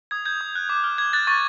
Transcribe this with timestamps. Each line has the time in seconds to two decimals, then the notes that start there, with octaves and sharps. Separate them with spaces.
0.11 D#6 G#6
0.25 G6 G#6
0.41 D#6
0.56 F#6
0.69 D6
0.84 F6
0.98 D6 G#6
1.13 F#6 A6
1.27 C#6 A6